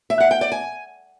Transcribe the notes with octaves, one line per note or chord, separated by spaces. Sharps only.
E5
F#5
G5
D5
G#5